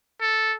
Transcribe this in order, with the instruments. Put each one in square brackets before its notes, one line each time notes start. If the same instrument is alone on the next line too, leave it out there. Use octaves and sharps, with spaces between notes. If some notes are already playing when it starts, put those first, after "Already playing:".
[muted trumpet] A4